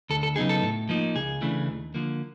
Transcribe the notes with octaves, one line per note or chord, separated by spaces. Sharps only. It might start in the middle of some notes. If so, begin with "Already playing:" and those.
D2 A4
A4
C#3 F#3 B3 D#4 G#4
A4
A2
F3 A#3 D#4
C#2 G#4
C#3 E3 A3 D4
D#2
D3 F3 A#3